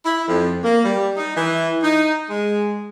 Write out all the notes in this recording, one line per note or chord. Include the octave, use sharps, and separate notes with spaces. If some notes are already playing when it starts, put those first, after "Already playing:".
E4
F2
A#3
G3
D#4
E3
D#4
G#3